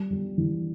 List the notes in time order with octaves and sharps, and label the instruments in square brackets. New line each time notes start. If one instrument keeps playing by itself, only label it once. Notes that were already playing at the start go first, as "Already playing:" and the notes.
Already playing: [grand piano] G3
G3
E3